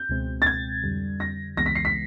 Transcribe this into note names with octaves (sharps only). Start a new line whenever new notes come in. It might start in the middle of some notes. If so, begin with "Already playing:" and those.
Already playing: G6
C#2 B2 G#3 C4
A6
G#6
F2 D3 G3
A#6
C#2 C#3 E3 G#3 B3 A#6
B6
C7
B6